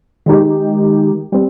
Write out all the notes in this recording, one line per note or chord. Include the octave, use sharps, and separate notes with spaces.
D#3 G#3 D#4 G4
G3 C4